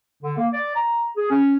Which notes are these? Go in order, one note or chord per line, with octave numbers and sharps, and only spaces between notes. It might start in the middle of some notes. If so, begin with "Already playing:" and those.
D3
A#3
D5
A#5
G#4
C#4